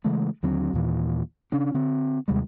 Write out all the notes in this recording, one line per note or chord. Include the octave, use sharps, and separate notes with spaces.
C#3 E3 G#3 A3
D#2 D3 F#3 C4
D#2 A#2 E3
C#3 C#4 D4
D3 C4
D#2 C3 G3 G#3